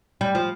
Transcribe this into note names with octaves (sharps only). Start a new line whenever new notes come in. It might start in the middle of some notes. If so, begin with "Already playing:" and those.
G3
F3